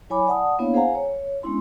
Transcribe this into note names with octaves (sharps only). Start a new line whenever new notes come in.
F#3 E4 C#5 G#5 B5 D6
D5 F#5 A5 D#6
A#3 B3 D4 E4 C#5 F5
G#4 C5 F5 F#5 G#5 A#5
C#5
G#3 B3 C#4 D4 E4 C6